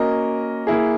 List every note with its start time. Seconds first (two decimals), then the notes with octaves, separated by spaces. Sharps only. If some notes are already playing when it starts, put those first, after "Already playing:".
Already playing: A#3 C#4 F#4 A#4 D#5
0.67 A#3 E4 G#4